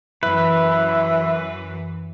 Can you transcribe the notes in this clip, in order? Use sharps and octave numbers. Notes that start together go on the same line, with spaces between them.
F#2 E3 E4 B4